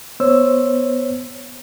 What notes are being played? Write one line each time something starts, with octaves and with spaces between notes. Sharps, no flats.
B3 C5 C#5 E6